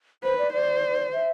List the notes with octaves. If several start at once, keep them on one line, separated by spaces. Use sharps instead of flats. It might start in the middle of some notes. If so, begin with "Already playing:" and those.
B4 C5
D5
C5 D5
E5